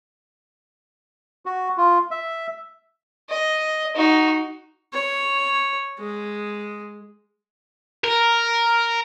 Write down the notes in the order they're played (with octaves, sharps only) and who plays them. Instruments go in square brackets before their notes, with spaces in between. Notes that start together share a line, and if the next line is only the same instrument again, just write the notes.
[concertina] F#4
F4
E5
[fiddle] D#5
D#4 F#4
[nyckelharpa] C#5
G#3
[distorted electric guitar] A#4